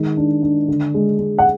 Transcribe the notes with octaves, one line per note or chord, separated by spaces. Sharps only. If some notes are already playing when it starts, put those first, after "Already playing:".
Already playing: D#3 G#3
D4
D4
D3
G#3
G#3
F#5